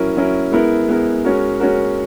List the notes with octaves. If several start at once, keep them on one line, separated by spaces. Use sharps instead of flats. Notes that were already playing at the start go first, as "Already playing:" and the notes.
Already playing: F#3 C#4 E4 A#4
F#3 C#4 E4 A#4
G#3 B3 E4 A#4
G#3 B3 E4 A#4
G#3 C#4 F#4 A#4
G#3 C#4 F#4 A#4